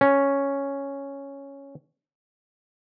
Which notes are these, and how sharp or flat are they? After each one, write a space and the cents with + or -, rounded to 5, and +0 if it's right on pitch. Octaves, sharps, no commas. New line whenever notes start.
C#4 +0